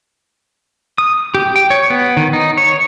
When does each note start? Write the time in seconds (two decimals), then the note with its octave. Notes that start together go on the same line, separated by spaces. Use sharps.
0.98 D#6
1.35 G4
1.56 G5
1.70 C#5
1.90 B3
2.17 D#3
2.33 D#4
2.57 C#5